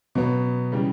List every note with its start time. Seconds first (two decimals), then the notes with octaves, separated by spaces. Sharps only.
0.15 B2 F#3 B3
0.72 C#3 E3 G3